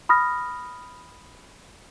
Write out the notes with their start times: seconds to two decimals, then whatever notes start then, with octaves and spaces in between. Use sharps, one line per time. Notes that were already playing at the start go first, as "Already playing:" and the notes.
0.09 B5 D#6 F6 A#6